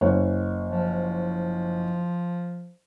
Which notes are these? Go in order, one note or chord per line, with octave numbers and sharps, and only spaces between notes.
F#1 C#5
F3